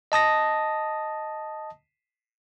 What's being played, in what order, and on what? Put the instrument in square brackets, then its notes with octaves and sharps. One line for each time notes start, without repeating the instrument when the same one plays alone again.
[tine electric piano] D#5 A5 D#6 A#6